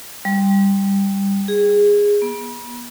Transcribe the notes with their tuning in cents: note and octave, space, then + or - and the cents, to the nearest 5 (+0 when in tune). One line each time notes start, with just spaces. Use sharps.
G3 +10
G#4 -15
B3 -40